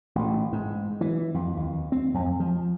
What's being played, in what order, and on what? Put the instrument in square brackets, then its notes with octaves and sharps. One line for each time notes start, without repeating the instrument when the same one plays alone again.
[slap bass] A1
G#2
E3
F2
D#2
C4
F2
F3